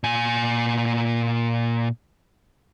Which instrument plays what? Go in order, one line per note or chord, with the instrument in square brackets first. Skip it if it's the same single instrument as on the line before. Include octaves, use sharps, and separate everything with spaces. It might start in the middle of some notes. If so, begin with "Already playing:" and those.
[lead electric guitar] A#2 G#5